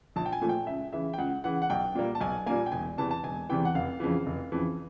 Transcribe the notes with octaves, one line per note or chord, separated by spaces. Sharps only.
A#1 A5
G5
G#5
A#2 F3 A3
G5
C#2 E5
C#3 E3 E5
G5
C#2 F#5
C#3 E3 F#5
F#5
B1 G5
A#2 G3 A#3
A5
B1 G#5
A#2 G3 A#3 G#5
G5
E1 G#5
E2 C3 E3 A5
A5
E1 G#5
E2 C3 E3 G5
F#5
F1 F5
F2 C#3 E3
F1
F2 C#3 E3